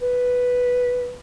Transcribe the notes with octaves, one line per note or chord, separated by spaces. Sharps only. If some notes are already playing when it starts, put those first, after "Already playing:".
B4